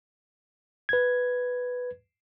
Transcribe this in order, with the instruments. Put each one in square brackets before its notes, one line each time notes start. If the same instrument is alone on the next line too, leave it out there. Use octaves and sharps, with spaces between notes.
[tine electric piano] B4 G#6